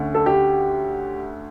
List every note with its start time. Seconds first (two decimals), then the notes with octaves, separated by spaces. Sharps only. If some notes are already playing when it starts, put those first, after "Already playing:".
Already playing: D2 D3 A3 C#4
0.15 A4
0.26 G4